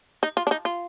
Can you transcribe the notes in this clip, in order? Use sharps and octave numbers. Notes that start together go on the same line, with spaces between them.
D#4
F4
D4
D#4
F4